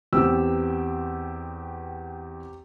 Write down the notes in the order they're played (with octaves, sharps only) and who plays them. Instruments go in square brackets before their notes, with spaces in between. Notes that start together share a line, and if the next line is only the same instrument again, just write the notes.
[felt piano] E2 B3 C4 [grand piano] G4 E6